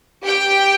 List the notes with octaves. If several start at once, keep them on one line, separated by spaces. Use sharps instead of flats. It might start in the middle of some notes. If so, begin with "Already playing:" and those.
G4 G5